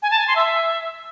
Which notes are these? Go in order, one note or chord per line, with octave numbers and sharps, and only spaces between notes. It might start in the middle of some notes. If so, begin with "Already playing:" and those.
G#5
A5
G#5
C6
E5